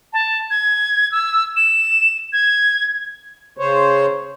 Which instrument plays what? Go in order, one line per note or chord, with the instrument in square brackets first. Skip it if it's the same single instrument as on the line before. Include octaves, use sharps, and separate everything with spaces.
[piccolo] A5
G#6
E6
E7
G#6
[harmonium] C#3 C5 C#5